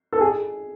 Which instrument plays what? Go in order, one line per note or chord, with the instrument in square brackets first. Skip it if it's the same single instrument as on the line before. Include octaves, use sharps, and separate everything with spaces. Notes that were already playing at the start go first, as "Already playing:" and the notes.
[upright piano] A4
G#4